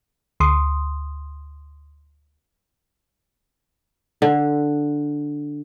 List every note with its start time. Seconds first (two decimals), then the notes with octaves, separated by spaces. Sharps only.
0.40 D2 C6 D#6
4.22 D3